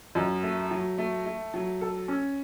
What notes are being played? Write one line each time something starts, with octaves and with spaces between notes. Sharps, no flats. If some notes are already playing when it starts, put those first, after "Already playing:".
F#2
A3
F#3
A3
A3
F#3
A4
C#4